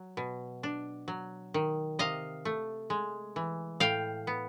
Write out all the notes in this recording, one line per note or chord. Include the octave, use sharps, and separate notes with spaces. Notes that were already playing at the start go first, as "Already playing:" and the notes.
Already playing: F#3
B2
D4
F#3
D#3
C3 D#5 F5
A3
G#3
E3
A2 F5 G5
B3